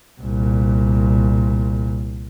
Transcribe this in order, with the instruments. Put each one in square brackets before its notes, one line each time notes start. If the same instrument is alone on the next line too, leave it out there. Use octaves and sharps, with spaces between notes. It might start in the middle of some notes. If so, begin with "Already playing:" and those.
[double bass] C2 A#2